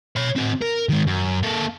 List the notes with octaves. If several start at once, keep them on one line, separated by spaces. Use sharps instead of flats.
C#5 B5
C4 F#4
A#4
D#3 G#3
F#2
A#3 A4